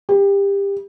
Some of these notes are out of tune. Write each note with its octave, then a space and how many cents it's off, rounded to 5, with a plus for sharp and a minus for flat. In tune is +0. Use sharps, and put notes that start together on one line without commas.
G4 +25